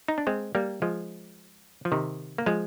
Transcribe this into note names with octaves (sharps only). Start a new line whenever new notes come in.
D#4
D4
G#3 C4
G3 A#3
F3 G#3
F3
C3 D#3
A#3
F3 G#3